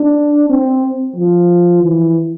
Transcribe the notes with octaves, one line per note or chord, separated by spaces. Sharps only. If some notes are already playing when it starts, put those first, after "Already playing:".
Already playing: D4
C4
F3
E3